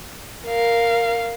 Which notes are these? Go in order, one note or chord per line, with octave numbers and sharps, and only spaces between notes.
A#4 F5